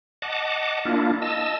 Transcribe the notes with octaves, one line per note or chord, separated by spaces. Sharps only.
D#5 F#5 A5 D6
A#3 D4 E4 F4
D#5 A5 E6